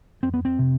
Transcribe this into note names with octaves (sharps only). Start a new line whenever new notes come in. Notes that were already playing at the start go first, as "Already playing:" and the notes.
F2 C4
B3
C4
C3